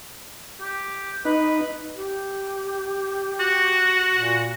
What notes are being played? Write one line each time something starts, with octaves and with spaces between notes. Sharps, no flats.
G4
D#4 B4
G4
F#4
A#2